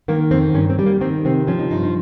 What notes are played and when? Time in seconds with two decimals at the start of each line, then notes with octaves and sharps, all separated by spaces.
0.08 D#3 A#3
0.31 F2 C4
0.54 G2 C#4
0.70 C4
0.79 G3
0.86 A#3
1.01 D#3 C4
1.25 C3 C4
1.47 F3 C#4
1.59 D#4
1.71 G2 D#4
1.83 D#4